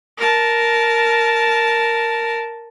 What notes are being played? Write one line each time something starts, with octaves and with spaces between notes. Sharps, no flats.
A#4 A5